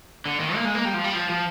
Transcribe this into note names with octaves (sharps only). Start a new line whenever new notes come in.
D3
D#3
A#3
G#3
A#3
G3
F3
G3
F3
F3